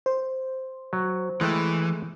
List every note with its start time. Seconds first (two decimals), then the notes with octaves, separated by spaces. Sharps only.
0.06 C5
0.93 F#3
1.41 E3 G#3 A3 G5